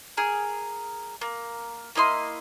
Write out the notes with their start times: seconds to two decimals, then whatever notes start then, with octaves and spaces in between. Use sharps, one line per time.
0.17 G#4 A#4
1.21 A#3
1.95 A#3 E4 D#5 C6